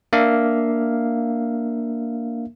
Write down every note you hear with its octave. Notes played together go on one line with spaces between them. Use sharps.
A#3 D4 E5 F5